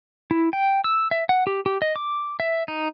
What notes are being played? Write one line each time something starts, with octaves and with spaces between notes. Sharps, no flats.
E4
G5
E6
E5
F#5
G4
G4
D#5
D6
E5
D#4